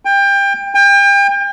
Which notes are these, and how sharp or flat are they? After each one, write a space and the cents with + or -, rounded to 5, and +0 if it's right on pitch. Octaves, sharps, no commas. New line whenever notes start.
G5 +25
G5 +35